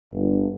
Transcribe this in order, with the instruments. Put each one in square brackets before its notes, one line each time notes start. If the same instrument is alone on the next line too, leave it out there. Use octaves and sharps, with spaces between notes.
[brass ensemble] G1